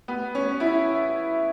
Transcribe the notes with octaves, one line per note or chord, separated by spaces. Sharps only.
B3
C#4
E4